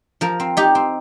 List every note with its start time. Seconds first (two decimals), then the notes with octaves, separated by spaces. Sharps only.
0.21 F3 A#4
0.40 C4
0.57 D#4 G4
0.75 C4